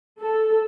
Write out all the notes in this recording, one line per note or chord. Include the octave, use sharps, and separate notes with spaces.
A4